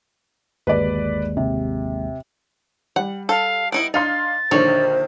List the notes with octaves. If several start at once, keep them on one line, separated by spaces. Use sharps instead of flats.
G1 D#2 G#3 B4 D5
C3
G3 F#5
A4 F5
B3 D#4 E4 D7
D4 D#4 F5 C6 A6
A#1 D3 D#3 G3 D#4 C5 C#5